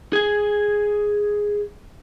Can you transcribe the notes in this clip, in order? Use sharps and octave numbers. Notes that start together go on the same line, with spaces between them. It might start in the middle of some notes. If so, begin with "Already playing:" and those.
G#4 G#5